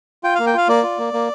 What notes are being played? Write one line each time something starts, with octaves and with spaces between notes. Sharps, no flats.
F4 G5
A#3 F5
G5
F4 F5
A#3 D5
F4
A#3
A#3